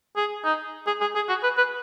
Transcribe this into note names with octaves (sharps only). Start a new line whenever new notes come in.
G#4
D#4
G#4
G#4
G#4
F#4
B4
B4